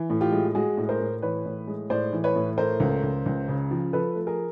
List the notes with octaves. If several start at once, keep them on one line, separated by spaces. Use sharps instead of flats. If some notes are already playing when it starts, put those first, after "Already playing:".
Already playing: E3
A2
F4 G4
G#3
G#3 F#4 G#4
A2
A#4 C5
A2
E3 B4 C#5
A2
G#3
A2 C5 D5
E3
B4 C#5
A2
A3 A#4 C5
C#2
C#2
C#2
C#3
F3
F3 A4 B4
A3
G#4 A#4